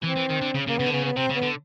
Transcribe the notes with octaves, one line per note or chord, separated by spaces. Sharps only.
E3 C4
E3
D#3
D3
C#3
C#3 A#3
C#3 B3
D3
C#3 B3
B3
C3 C4
C#3
B3
D3